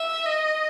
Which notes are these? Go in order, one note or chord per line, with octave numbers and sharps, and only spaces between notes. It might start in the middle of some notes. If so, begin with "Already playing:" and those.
Already playing: E5
D#5